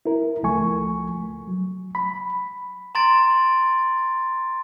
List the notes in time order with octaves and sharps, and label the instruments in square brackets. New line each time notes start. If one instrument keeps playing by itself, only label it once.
[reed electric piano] E4 A#4
C#2 F3 A3 G#5 C#6
F#3
B5
[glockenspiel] A#5 C6 A6 D7